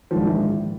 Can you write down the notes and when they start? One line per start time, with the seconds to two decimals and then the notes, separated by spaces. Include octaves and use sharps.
0.11 A#1 G#2 D#3 F3
0.25 E3